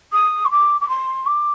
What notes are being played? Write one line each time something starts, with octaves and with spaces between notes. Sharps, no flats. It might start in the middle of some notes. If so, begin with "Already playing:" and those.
D#6
C6
D6
D6
C6
D6